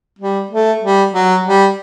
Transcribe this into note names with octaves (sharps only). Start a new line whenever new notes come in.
G3
A3
G3
F#3
G3